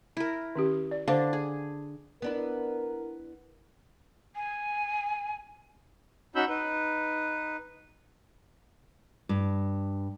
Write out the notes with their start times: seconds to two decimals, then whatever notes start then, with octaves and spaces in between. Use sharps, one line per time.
0.17 E4 A#4
0.55 D#3 C#4 G4
0.91 D5
1.08 D3 D4 C5 F5
1.33 G#4
2.22 B3 D4 E4 A#4
4.35 G#5
6.35 C#4 D#4 F#4 B5 E6 G6
6.49 D#4 B4
9.29 G2